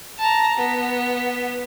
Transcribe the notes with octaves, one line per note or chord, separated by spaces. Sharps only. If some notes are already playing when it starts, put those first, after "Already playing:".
A5 A#5
B3